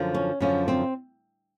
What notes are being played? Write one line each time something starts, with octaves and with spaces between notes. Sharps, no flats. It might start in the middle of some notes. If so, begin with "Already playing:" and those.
Already playing: F#2 D3 F3
C#4
F#2 D3 F3 C#4
C4